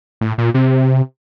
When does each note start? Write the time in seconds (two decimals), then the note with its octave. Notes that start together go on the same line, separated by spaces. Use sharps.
0.21 A2
0.38 A#2
0.54 C3